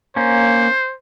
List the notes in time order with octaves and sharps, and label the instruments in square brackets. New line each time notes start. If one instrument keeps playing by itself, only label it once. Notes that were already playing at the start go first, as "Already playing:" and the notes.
[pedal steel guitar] A#3 C#4 [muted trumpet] C5